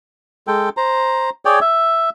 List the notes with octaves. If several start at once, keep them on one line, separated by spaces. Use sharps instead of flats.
G#3 A4 G5
C5 A#5
G#4 C#5 D5 G5
E5